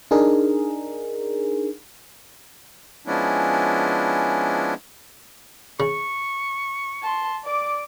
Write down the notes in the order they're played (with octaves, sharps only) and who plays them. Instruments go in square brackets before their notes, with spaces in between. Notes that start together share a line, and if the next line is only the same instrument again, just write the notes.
[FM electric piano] D4 D#4 G#4 A#4
[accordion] F3 G#3 B3 C#4 D4 E4
[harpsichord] C#3 [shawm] C#6
[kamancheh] A5 C6
D5 D6